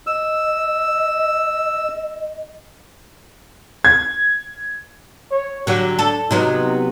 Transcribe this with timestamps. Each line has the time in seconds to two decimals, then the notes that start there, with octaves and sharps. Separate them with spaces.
0.07 D#5 E6
3.85 G#6
5.31 C#5
5.67 D3 F#3 G4
5.99 D4 A4
6.31 C3 F#3 B3 D#4